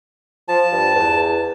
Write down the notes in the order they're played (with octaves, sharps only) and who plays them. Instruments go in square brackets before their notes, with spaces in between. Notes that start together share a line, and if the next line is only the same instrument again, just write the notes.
[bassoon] F3 [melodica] A5
[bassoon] G2
E2